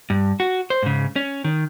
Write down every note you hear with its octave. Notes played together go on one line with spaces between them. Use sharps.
G2
F#4
C5
G#2 C#3
C#4
D#3